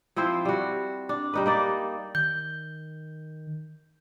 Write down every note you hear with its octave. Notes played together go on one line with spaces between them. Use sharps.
F3 C4 E4 C5
G3 F#4
D4
G3 D#4 B4
A#3 D#4 D5
D#3 G6